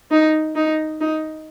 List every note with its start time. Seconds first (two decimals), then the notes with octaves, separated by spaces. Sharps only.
0.11 D#4
0.55 D#4
1.01 D#4